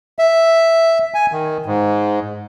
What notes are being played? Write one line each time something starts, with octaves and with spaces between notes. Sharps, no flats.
E5
G#5
D#3
G#2